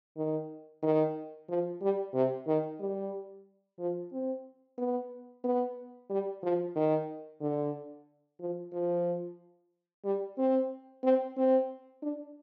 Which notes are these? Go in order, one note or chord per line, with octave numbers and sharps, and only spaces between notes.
D#3
D#3
F3
G3
C3
D#3
G3
F3
C4
B3
B3
G3
F3
D#3
D3
F3
F3
G3
C4
C4
C4
D4